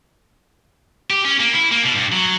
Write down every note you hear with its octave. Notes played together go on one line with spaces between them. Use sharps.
G4
C#4
A#3
E4
A#3
B2
G2
F#3